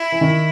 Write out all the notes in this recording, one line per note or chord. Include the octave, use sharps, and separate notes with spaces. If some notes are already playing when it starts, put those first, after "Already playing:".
Already playing: E4
E3
D#3